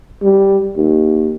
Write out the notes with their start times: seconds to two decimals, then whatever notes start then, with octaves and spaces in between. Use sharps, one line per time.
0.22 G3
0.77 D#2